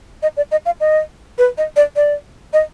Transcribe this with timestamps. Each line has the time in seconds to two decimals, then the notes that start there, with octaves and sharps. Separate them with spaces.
0.23 D#5
0.37 D5
0.51 D#5
0.66 F5
0.80 D#5
1.38 B4
1.58 D#5
1.76 D5
1.96 D5
2.53 D#5